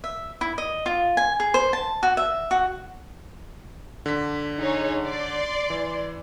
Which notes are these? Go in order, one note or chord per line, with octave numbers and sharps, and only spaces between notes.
E5
E4
D#5
F4
G#5
G#4
C5
A5
F#4
E5
F#4
D3 B6
D#4 G#4 C#5
D5 C6
E3